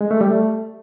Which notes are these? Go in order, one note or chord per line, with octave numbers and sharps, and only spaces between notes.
G#3
A3
G3
A3